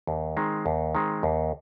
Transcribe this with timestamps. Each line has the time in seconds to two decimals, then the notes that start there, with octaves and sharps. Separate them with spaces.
0.07 D#2
0.37 D#3 G#3 C4
0.66 D#2
0.95 D#3 G#3 C4
1.23 D#2